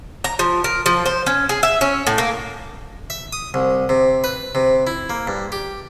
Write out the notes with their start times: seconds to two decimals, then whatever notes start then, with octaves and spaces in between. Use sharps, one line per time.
0.24 A#5
0.39 F3
0.64 A#4
0.86 F3
1.06 C5
1.26 C#4
1.49 G#4
1.63 E5
1.81 C#4
2.07 A2
2.18 A#3
3.10 E5
3.33 D#6
3.54 C2
3.89 C3
4.24 B4
4.55 C3
4.87 E4
5.10 A#3
5.27 G2
5.52 G4